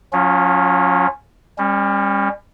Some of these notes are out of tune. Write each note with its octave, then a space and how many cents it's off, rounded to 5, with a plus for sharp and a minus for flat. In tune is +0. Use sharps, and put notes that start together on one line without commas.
F#3 -40 C#4 +0 F4 +0
G3 +35 C#4 -15